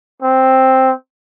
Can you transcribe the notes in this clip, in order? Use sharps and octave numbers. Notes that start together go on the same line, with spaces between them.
C4